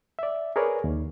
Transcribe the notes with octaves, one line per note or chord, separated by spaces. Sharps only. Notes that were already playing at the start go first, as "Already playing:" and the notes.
D5 E5
G#4 A#4 B4 C#5 D5
D#2